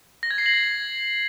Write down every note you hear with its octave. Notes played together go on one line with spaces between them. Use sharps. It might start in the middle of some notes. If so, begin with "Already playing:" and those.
A#6
G#6
C7
F#7
G#6